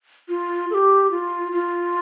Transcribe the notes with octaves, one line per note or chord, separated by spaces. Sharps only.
F4
A4
G4
F4
F4